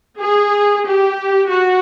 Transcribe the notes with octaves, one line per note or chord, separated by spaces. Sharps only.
G#4
G4
F#4